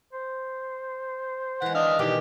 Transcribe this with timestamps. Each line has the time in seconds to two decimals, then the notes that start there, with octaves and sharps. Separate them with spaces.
0.13 C5
1.62 E3 G#3 F#5
1.75 D4 D#5 F5
1.99 B2 D#3 E3 G4